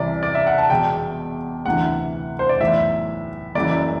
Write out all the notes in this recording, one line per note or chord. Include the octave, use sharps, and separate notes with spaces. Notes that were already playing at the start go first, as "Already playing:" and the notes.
Already playing: C2 C3 E3 D5
D5
E5
F#5
A5
E1 E2 B2 G5
D2 C3 E3 F#5
C5
D5
B1 A2 E3 E5
F#1 F#2 E3 D5